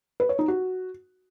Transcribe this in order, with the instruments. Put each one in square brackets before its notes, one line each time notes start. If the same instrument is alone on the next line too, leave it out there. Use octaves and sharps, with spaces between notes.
[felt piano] B4
C#5
D#4
F#4